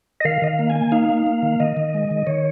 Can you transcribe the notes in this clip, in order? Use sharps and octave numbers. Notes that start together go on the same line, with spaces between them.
D#5
D#3 F5
D#3 D#5
F5
A#3
G#5
A#3
D#4 F5
A#3
A#3
D#3
D#3 D#5
D#3
G#3
D#3
D#3 C#5